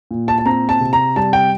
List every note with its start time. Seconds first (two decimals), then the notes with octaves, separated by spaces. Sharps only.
0.11 A#2
0.28 A5
0.38 A5
0.45 C4 A#5
0.69 A5
0.81 C3
0.93 A#5
1.16 G3 A5
1.33 G5